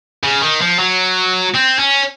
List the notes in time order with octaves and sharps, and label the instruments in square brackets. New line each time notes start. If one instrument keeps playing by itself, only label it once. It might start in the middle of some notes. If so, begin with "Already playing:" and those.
[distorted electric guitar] C#3
D#3
F3
F#3
C4
C#4